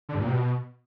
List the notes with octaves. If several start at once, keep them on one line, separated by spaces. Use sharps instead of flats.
D3
G2
A#2
C3
B2